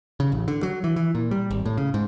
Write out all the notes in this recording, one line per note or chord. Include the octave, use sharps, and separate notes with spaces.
C#3
A1
D3
F#3
E3
E3
A#2
G3
G#1
A2
C#3
G#2